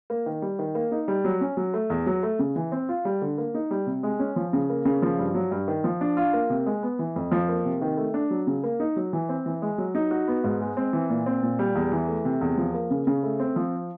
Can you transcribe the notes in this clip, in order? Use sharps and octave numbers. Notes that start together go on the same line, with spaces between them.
A#3
D#3
G3
D#3
A#3
D#4
G3
F#3
C#4
F#3
A3
E2
F#3
A3
C#3
E3
C4
F4
G3
D3
A#3
D#4
G3
C3
G#3
C#4
F3
C#3
A#3
C#3
F3
G2
F#3
G2
D#3
F3
D4
F4
A#3
C3
G#3
B3
E3
F2
F3
A#3
C3
D#3
A3
D4
F#3
C#3
A#3
D#4
F#3
E3
C4
E3
G#3
F#3
D#4
F#4
B3
G#2
G#3
C4
E3
A#2
C4
A#2
G3
E2
E3
A3
C3
E2
F3
A#3
C#3
C#3
A3
C4
F3